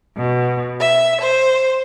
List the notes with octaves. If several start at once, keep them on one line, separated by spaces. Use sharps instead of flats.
B2
E5
C5